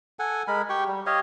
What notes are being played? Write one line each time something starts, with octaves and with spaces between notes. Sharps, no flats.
A4 F#5 G#5
G#3 A#4 B5
G4 G5 C#6
G3
G4 C#5 D#5 F5